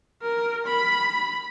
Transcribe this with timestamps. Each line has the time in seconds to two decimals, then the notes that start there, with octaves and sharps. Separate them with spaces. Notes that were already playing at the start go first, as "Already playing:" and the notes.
0.22 A#4
0.66 B5